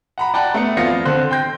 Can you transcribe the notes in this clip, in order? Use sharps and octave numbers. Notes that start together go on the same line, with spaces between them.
F#5 A#5 B5
D5 F#5 G5 A5 A#5 F#6
A3 B3 C#7
F2 B3 F4 D5 A#6 C#7
D3 C4 C5 F#6
G5 C6 G6 A#6